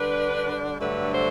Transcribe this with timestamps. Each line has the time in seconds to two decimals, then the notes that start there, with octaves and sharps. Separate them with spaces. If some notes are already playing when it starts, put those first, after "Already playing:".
Already playing: D3 G3 D4 B4
0.79 G2 D3 F#3 A3 B4
1.12 C5